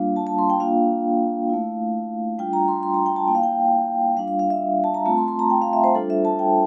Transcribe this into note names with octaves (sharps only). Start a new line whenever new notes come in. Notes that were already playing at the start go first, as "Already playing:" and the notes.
Already playing: G3 A#3 D4 F4 F5
A5
A5
C6
G5
A#3 D4 F4 F5
A3 E4
G3 D4 F4 G5
A#5
C6
C6
A#5
G5
A5
A#3 E4 G5
F5
G5
G3 D4 F4 F5
F5
F5
E5
A5
A#5
A3 C4 F4 A5
C6
C6
A#5
G5
F5
E5
C5
G3 D4 F4 A4
E5
A5
G5